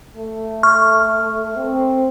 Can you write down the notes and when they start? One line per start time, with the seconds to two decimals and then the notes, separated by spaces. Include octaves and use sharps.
0.17 A3
0.63 C#6 F6
1.56 C4